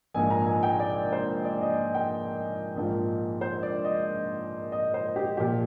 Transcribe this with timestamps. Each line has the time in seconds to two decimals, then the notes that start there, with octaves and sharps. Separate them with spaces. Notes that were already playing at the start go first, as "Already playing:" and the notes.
0.14 A#1 G#2 F3 A#3 G#5
0.30 A#5
0.47 G#5
0.63 G5
0.80 D5
1.13 C5
1.45 D5
1.62 D#5
1.94 G5
2.76 A#1 G#2 F3 A#3
3.41 C5
3.63 D5
3.85 D#5
4.72 D#5
4.94 C5
5.16 G4
5.37 A#2 F3 G4